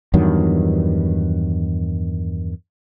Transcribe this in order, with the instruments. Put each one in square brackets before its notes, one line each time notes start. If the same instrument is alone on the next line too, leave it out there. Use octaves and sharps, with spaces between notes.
[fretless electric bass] E2 G2 D#3 F#3